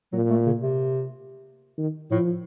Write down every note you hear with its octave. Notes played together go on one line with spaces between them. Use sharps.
A#2 F#3
A3
C#3
C3
D#3
A2 F3